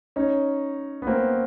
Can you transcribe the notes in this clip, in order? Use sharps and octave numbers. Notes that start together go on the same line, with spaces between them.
C#4 D#4
B3
A#3 C4